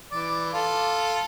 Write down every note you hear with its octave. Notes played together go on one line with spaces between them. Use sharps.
E3 D5
F4 A4